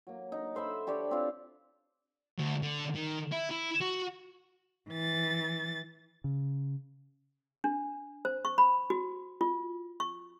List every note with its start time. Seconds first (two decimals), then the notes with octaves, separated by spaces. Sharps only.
0.07 F#3 A#3
0.32 D#4
0.55 A4 C5 E5 B5
0.87 D4 G4 C#5 D5
1.11 C4 F4
2.39 D2
2.63 D3
2.96 D#3
3.32 E4
3.50 E4
3.81 F#4
4.91 E3 A6
6.24 C#3
7.64 D4
8.25 C5
8.45 C#6
8.58 B5
8.90 F#4
9.41 F4
10.00 C#6